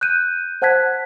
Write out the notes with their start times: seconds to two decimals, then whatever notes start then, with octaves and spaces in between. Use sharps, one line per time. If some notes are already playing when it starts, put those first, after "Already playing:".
0.01 F#6 G6 D#7
0.62 C5 F#5 A5 F#6 G#6 B6